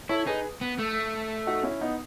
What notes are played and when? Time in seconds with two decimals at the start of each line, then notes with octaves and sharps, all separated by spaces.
0.09 E4 A4 C#5
0.27 D#4 G#4 B4
0.61 B3
0.79 A3
1.47 D#4 F#4
1.63 C#4 E4
1.81 B3 D#4